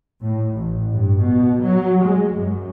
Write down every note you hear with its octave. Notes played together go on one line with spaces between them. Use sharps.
A2
A1
G2
B2
F#3
G#3
F#2